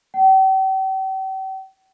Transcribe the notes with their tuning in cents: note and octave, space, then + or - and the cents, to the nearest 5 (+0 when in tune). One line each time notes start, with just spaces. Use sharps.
G5 -40